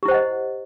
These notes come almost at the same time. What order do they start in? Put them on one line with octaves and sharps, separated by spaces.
G4 E4 C5 F#5 D#5